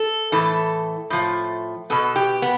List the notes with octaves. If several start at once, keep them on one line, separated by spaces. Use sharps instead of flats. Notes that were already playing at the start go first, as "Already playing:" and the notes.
Already playing: A4
A2 E3 A3 A4
A2 F3 A3
B2 B3 A4
G4
B3